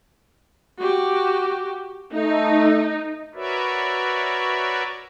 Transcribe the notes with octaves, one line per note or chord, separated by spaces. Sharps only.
F#4 G4
A3 D#4
F#4 A#4 B4 C#5 D5 E5